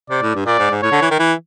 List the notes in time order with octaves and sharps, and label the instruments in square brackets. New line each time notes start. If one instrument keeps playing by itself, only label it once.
[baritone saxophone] C3 [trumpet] D5
[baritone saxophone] A2
G2
[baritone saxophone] A#2 [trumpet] D5
[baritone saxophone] G#2
G#2
[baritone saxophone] A2 [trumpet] C#5
[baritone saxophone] D3
E3
D#3
E3